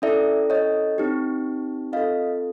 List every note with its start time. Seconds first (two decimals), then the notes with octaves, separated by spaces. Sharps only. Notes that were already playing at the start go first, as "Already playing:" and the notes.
0.02 C#4 E4 A4 D5 E5
0.50 C#5 D#5
0.98 C4 D#4 G4
1.92 C4 F4 A4 D#5 F5